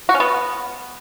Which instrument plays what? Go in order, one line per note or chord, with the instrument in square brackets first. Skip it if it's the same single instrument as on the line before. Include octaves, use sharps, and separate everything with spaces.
[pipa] F#4
C#4
B3